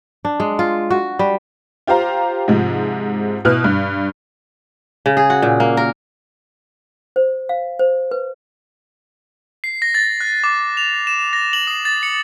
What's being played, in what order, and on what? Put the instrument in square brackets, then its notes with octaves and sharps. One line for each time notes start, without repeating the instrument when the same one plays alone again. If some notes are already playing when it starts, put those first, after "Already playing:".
[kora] D4
G#3
F4
F#4
G3
[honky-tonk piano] F4 G4 C5 F5 A#5
G#2 C3 F3 G#3
B2 E4 B4 F6 F#6
G2
[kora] C#3
G#4
F#4
A#2
A#3
A#4
[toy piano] C5
F5
C5
B4
[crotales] C7
A#6
A6
F#6
D6
F7
E7
A#6
F#7
D#6
A6
C#7